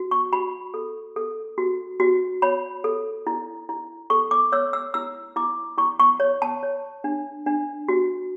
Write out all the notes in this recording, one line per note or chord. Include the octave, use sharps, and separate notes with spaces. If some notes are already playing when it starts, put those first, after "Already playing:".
Already playing: F#4
C#6
F#4 B5
A4
A4
F#4
F#4
C#5 B5
A4
E4
E4
A4 C#6
D6
C#5 E6
E6
E4 E6
E4 D6
E4 C#6
C#6
C#5
A5
C#5
D4
D4
F#4